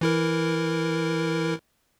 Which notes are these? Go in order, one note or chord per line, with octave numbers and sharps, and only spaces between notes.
E3 E4 A#4